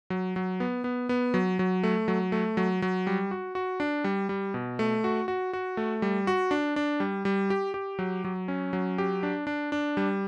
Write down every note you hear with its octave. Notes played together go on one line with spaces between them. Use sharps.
F#3
F#3
B3
B3
B3
F#3
F#3
A3
F#3
A3
F#3
F#3
G3
F#4
F#4
D4
G3
G3
B2
A3
F#4
F#4
F#4
A3
G3
F#4
D4
D4
G3
G3
G4
G4
F#3
F#3
C#4
F#3
G4
D4
D4
D4
G3